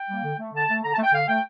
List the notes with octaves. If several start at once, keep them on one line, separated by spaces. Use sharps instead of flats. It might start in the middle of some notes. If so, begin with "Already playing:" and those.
Already playing: G5
G3 A#3
D3
A3
D3 A5
A3
D3 A#5
A5
A3
G5
D3 F5
A3 G5